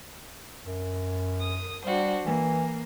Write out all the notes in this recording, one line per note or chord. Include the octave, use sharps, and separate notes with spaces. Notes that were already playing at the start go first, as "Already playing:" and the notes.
F#2
D#6
G3 D4 F#4 C5
E3 A#3